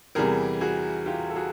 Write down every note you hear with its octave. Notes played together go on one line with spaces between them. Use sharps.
E2 C3 E3 G3 G#4 A#4
F#4 G#4
F4 G4
A4
F#4 G#4